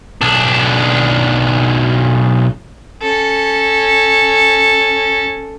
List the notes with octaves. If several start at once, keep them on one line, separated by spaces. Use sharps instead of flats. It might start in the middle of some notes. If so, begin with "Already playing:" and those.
B1 D4
C#4 A4